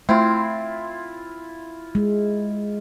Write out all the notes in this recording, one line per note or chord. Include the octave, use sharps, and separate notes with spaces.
A3 C4 E4 F4
G#3